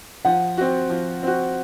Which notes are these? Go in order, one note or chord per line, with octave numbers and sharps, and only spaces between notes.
F3 F#5
C4 F#4
F3
C4 F#4